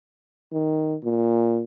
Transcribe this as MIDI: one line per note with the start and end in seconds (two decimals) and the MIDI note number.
0.52 0.96 51
1.04 1.63 46